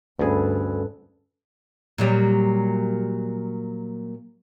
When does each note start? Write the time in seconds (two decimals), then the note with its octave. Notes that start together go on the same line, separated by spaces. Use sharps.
0.19 D2 G2 C#4 G#4 A4 B4
1.98 A#2 F#3 G3